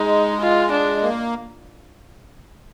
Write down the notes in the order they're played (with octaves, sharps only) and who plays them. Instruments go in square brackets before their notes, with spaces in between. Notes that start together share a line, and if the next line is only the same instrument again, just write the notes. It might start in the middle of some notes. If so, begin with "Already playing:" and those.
Already playing: [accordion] G#3 [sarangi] D#4
[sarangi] F4
D4
[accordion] A#3